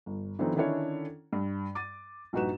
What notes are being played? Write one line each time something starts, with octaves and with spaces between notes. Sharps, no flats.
G1
D3 E3 F#3 B3 C4 D#4
D3 D#3 C#4 D4 E4 C#5
G2
D6 A6 D#7
A#1 G2 D#4 F#4 B4 E7